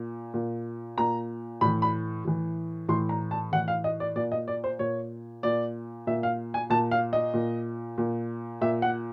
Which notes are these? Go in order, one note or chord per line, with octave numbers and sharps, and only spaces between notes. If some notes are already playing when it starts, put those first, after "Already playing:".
Already playing: A#2
A#2
A#2 A#5
A2 E3 B5
B5
A2 E3
A2 E3 C6
A#5
A5
A2 E3 F#5
F5
D#5
D5
A#2 D5
D#5
D5
C5
A#2 C#5
A#2 D5
A#2 E5
F5
G#5
A#2 A5
F5
D#5
A#2
A#2
A#2 E5
F#5